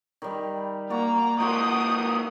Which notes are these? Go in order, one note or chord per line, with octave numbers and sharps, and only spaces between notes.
D#3 G3
A#3 F#4 D5 A#5
G#2 A#3 F#4 C5 D#6